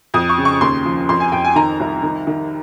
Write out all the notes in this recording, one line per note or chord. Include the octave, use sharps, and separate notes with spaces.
F2 D#6
C#6
C#3
C#6
D#2 C6
F3
F2 C6
G#5
F2 G5
G#5
D#3 A#5
C2
D#3
D#3